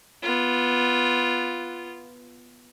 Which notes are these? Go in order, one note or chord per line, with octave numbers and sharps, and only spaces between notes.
B3 F4